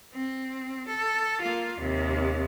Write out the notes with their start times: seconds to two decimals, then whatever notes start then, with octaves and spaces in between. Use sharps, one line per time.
0.14 C4
0.87 A4
1.41 A#3 F4
1.79 D#2 C3